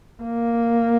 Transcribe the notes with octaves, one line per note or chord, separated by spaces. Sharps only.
A#3